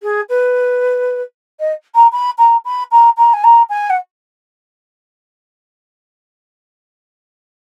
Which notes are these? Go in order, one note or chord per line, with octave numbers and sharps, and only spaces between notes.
G#4
B4
D#5
A#5
B5
A#5
B5
A#5
A#5
G#5
A#5
G#5
F#5